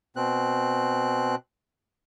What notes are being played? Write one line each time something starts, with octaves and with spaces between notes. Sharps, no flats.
B2 C4 F#6